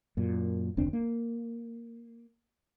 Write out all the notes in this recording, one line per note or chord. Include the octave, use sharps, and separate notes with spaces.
F#2 A#2
F1 D2 C4 D4
A#3